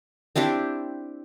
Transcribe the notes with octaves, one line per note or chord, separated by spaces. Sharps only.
C4 D4 E4 G4